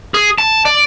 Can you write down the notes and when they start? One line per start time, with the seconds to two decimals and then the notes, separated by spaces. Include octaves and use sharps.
0.14 G#4
0.38 A5
0.65 D5